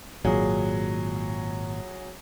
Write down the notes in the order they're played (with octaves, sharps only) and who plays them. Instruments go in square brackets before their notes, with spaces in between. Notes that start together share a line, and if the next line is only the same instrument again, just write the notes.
[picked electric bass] G#1 A#2 [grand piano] F#3 G#4